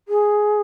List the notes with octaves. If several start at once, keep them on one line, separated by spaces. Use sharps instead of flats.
G#4